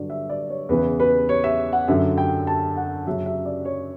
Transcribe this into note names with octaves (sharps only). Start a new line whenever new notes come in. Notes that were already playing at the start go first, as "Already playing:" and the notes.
Already playing: G2 D3 F#3 D5
E5
D5
C#5
E2 C#3 E3 B4
B4
C#5
E5
F#5
F#2 D3 F#3 E5
G5
A5
F#5
F#2 C#3 F#3 E5
E5
D5
C#5